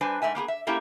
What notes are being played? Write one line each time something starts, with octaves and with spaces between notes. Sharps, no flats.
G3 D4 B4 C5 G#5
G#2 A3 E5 G#5
A#3 B3 G4 G#4
E5
A3 A#3 C#4 E4 G4